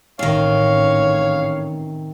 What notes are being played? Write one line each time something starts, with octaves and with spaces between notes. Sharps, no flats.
A1 C3 D#3 C#5 F5